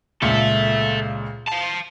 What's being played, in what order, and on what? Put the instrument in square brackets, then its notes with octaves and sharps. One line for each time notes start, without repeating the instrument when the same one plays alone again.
[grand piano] C#2 A#2 C#7 [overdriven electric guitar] A4 E5
[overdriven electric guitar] F5 A5